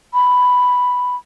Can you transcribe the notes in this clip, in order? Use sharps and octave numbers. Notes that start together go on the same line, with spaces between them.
B5